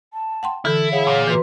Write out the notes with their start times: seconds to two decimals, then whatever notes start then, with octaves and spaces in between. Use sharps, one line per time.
0.13 A5
0.43 F#5 G5 C6
0.65 D3 E3 E4 A4
0.92 G#4 C#5 F5 F#5
1.07 A#2
1.27 E3 F#4 B4 C6